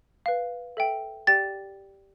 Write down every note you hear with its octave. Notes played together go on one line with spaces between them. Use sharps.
B4 F5
A4 E5 G5
G4 D5 G5 A6